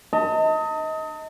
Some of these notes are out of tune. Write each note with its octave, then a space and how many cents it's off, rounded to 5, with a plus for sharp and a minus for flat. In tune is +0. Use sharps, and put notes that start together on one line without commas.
D#5 +25 A5 +45